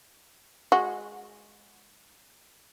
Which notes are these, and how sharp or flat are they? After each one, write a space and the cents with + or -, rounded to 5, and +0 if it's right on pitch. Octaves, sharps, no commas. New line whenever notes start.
G#3 +0 F#4 -20